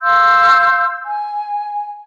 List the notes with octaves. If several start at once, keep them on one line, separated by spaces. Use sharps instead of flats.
F5 C6 E6 G6
G#5